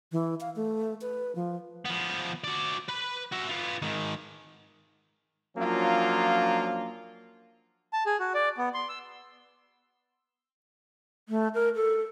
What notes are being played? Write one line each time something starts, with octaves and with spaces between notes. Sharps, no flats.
E3
F5
A3
B4
F3
F3 B3
F#4 D5
B4 B5
F#4 E5
B3 F4
G#2 D#3
F3 F#3 A#3 C#4 D4 F4
A5
G#4
F#4
D5
B3
C6
E6
A3
A#4
A4